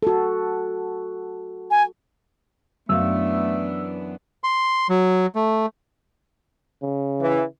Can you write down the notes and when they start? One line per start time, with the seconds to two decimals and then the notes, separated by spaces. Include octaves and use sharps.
0.03 F#4 A4
1.71 G#5
2.89 F#2 E3 A3 B3 D4 F5 E6
4.44 C6
4.89 F#3
5.35 A3
6.82 C#3
7.21 E3